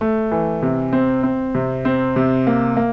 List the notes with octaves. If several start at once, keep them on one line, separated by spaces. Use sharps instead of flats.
A3
E3
C3
C4
C4
C3
C4
C3
A#3
A#3